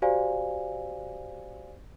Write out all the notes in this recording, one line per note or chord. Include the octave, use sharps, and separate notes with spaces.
F#4 G4 C5 D5 F5 G#5